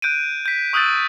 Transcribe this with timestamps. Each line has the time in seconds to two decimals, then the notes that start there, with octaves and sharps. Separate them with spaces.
0.02 F#6 G6 D7 D#7
0.46 G6 B6
0.73 C#6 D#6 E6 F#6 G6 A6